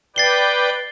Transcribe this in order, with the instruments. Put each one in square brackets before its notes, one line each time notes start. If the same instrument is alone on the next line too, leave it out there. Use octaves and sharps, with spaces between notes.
[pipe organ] B4 D5 G5 [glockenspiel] A6 C7 G7